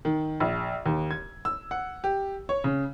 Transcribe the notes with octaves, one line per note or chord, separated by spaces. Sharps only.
D#3
A#1
D#2
G#6
E6
F#5
G4
C#5
C#3